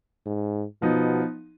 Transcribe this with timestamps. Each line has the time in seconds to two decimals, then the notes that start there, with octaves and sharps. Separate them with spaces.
0.26 G#2
0.81 B2 F3 B3 D#4